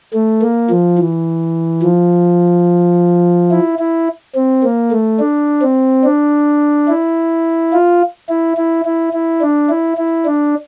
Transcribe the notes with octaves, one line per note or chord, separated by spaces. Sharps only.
A3
A#3
F3
E3
F3
E4
E4
C4
A#3
A3
D4
C4
D4
E4
F4
E4
E4
E4
E4
D4
E4
E4
D4